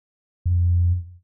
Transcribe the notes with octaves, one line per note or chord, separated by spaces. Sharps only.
F2